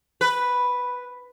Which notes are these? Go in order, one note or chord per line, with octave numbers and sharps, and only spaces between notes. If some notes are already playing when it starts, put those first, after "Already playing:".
B4